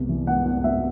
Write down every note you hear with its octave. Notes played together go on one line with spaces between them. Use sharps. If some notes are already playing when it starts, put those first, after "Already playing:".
Already playing: C2 B3
E3
B3 F#5
B3
B3 E5